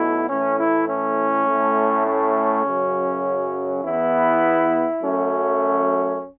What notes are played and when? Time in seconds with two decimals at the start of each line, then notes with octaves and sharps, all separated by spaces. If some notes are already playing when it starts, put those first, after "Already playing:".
Already playing: B1 B2 A3 E4
0.29 A2 E3 A3 C#4
0.60 E4
0.89 C#4
1.47 A2 A3
2.06 C#4
2.66 F#2 C#3 F#3
3.84 E2 E3 B3 E4
5.03 F#2 F#3 A3 C#4